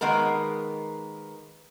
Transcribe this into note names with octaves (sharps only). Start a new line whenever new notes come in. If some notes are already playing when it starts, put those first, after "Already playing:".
D#3 G#3 A#3 B3 A#4